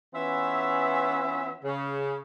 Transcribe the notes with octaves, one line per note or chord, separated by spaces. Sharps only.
E3 B3 C#4 F4 E5
C#3